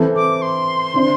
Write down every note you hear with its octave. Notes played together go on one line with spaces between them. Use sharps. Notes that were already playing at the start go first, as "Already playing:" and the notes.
Already playing: E3 C4 A4 C5
D6
C6
D3 C4 E4 C5